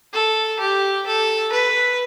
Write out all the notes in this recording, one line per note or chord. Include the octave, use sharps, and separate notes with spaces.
A4
G4
A4
B4